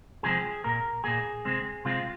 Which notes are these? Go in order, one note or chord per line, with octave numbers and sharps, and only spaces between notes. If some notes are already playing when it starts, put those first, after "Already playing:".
C3 F3 G#3 C4 G#4
A#2 A#3 A#4
A#2 A#3 G#4
C3 G#3 C4
C3 G#3 C4 F4